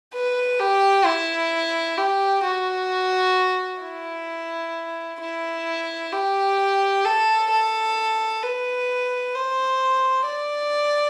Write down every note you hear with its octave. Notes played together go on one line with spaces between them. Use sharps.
B4
G4
E4
G4
F#4
E4
E4
G4
A4
A4
B4
C5
D5